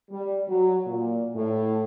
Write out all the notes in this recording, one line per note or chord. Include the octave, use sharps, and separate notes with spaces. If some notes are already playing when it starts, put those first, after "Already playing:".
G3
F#3
A#2
A2